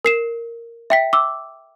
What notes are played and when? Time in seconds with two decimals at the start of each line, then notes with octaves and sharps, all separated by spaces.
0.05 A#4 C7 E7
0.90 E5 G5 B6
1.13 D6 E6